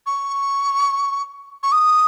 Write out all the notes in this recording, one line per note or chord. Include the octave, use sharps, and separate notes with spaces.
C#6
C#6
D#6